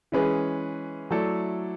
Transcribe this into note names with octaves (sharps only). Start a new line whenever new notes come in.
E3 G#3 C#4 G#4 B4
F#3 A3 E4 A4 D5